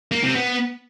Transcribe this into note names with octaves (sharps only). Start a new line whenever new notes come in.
A#3
C3
B3